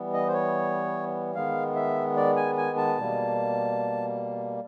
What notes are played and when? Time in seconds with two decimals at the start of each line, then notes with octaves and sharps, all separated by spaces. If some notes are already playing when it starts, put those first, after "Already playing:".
Already playing: E3 G3 B3
0.14 D#5
0.28 C5
0.34 C#5
1.35 D#3 G#3 B3 F5
1.76 E5
2.17 D5
2.37 G#5
2.58 G#5
2.77 A5
2.98 B2 G3 A#3